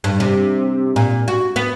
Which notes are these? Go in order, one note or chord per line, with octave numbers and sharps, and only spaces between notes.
G2
C3
A#2
F#4
B3